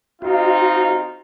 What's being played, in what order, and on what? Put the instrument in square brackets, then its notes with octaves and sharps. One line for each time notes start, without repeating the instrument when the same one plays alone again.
[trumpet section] C4 D#4 F4 [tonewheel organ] F#4 F5